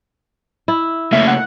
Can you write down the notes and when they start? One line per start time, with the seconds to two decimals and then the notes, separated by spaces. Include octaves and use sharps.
0.68 E4
1.13 C#3 A3 A#3 E5
1.28 F#5